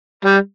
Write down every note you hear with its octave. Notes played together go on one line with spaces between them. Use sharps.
G3